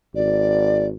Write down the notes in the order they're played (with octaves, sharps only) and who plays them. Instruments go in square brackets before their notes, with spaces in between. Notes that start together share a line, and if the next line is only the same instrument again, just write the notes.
[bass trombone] G#1 [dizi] D5